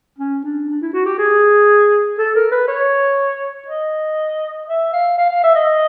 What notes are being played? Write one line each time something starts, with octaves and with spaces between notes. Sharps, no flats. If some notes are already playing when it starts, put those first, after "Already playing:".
C#4
D4
D4
E4
F#4
G4
G#4
A4
A#4
B4
C#5
D#5
E5
F5
F5
F5
E5
D#5